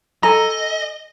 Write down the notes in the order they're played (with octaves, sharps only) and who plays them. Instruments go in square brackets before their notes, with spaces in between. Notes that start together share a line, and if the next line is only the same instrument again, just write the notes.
[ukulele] A4 G#5 [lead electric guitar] D#5 [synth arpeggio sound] A#5